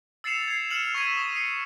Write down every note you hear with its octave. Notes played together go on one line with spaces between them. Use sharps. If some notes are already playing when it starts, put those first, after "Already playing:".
E6 A6 C7 C#7 E7 F7
G#6 C7
F6 C#7 E7 F#7
C#6 E6 G#6 B6 D#7
D#6
D#6 C7 C#7